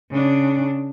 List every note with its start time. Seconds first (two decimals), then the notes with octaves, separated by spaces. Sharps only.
0.10 C#3 D4